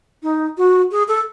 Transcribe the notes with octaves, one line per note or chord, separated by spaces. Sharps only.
D#4
F#4
G#4
A4